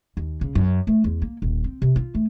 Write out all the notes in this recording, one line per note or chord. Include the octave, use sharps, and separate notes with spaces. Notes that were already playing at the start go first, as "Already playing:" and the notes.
D#2
C#3
F#2
A3
E2
A#3
D#1
C4
C3
F4
A3